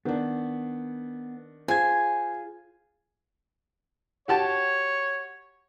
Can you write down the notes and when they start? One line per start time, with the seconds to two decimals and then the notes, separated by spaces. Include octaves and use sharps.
0.05 D#3 B3 D4
1.68 F4 G#4 C5 G#5 G#6
4.28 F#4 G4 C#5 A5